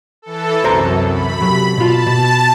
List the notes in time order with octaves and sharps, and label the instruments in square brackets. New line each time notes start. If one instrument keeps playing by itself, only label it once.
[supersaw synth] E3 A4
[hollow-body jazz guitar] C2 C5 A#5 [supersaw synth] F#2
[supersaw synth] B5
[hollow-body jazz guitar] C3 F#3
[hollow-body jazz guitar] B2 F4 [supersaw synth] A5
[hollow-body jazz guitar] B2